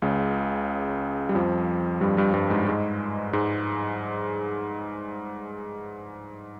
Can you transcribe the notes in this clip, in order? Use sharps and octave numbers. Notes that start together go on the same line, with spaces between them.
C#2 C#3
G3
F2 F3
G2 G3
G2 G3
G2 G3
G#2 G#3
G#2 G#3
G#2 G#3